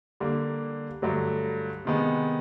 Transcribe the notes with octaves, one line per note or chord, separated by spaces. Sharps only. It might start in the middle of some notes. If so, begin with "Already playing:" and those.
D3 G3 A#3
G2 D3 F#3 A3
C3 D#3 G#3 B3